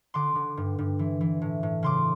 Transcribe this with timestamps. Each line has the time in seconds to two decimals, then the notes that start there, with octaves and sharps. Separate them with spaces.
0.14 D3 C6 D6
0.35 D3
0.57 G2
0.79 G2
0.99 E3
1.21 E3
1.42 A2
1.63 A2
1.83 C#3 C6 D6